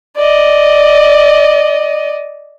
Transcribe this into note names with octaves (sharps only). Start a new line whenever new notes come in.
D5 D#5